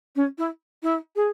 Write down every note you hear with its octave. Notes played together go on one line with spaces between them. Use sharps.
C#4
E4
E4
G#4